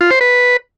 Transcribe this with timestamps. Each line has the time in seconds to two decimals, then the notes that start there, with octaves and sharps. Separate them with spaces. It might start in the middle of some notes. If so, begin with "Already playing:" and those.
0.01 F4
0.11 C5
0.21 B4